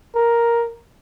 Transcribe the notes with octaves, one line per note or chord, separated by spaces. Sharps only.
A#4